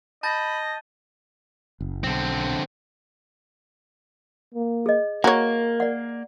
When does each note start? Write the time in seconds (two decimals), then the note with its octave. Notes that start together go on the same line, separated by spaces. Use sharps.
0.23 D#5 A5 B5 G6 A6
1.80 F#1
2.04 B1 D3 C4
4.54 A#3
4.86 G#4 D#5
5.24 A#3 F#4 A#4 C#5 A#5
5.80 D5 F#5